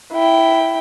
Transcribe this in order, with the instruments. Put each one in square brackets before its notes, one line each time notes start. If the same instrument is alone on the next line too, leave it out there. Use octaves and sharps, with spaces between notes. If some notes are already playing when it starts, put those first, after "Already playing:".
[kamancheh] E4 G5